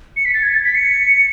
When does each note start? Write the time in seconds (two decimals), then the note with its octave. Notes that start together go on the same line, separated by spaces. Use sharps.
0.17 C#7
0.25 B6
0.34 A6
0.43 G#6
0.52 A6
0.64 B6
0.75 C#7